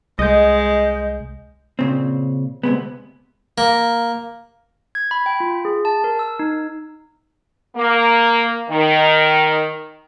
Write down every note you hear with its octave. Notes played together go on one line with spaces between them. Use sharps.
C2 G#3 D#5 G6
A#2 C#3 C4
D2 C3 G#3 B3
A#3
G#6
B5
G5
F4
G#4
A5
A#4
E6
D#4
A#3
D#3